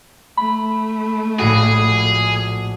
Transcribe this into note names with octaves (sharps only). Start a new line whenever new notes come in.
A3 B5
A#1 A2 F#4 G#4